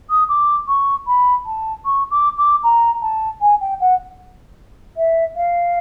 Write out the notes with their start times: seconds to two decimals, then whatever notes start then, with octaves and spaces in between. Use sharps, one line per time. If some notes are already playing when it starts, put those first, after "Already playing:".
0.10 D#6
0.29 D6
0.68 C#6
1.07 B5
1.46 A5
1.85 C#6
2.11 D6
2.37 D6
2.63 A#5
3.02 A5
3.41 G#5
3.61 G5
3.80 F#5
4.97 E5
5.36 F5